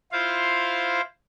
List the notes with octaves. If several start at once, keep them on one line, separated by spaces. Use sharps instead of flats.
E4 F4 C5 F5